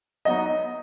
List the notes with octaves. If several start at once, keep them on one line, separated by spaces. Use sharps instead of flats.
F#3 B3 D#4 D#5